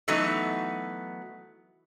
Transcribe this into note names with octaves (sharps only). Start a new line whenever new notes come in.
E3 F#3 A3 B3 D#4